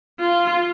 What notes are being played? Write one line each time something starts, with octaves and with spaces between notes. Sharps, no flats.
F4